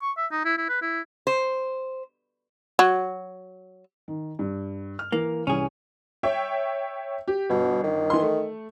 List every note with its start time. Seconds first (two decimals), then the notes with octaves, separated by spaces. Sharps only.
0.02 C#6
0.17 E5
0.32 D#4
0.45 E4
0.58 E4
0.69 B4
0.82 E4
1.27 C5
2.79 F#3
4.08 D#3
4.39 G2
4.99 F6
5.12 E3 A#3
5.47 C2 E3 C#4 G#4
6.23 C#5 E5 G5
7.28 G4
7.50 G1 B2
7.84 D#3
8.10 E3 C6
8.22 A3